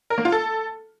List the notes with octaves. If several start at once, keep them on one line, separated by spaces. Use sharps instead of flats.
A#4
A#3
F4
A4